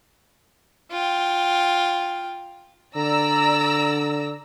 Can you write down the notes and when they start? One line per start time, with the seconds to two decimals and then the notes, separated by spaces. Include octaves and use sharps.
0.91 F4 G5
2.96 D3 D5 A#5 E6